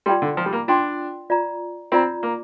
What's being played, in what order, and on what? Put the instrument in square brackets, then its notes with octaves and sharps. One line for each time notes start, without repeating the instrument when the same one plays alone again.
[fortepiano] G3 [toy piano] F4 D5 G5 C6
[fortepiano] D3
F3
G3
A#3
[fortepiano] D4 [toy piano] F4 D5 G5 C6
[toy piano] F4 D5 A#5
[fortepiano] C4 [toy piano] F4 D5 A#5
[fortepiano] A#3